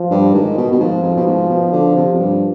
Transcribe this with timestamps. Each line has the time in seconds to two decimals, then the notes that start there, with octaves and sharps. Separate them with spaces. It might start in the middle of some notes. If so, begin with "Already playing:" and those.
Already playing: F3
0.11 G2
0.33 G#2 D#3
0.57 B2
0.72 B2
0.80 G#2 F3
1.03 F2
1.17 B2
1.26 G#2
1.49 B2
1.72 D3
1.96 C3
2.14 F2
2.19 G2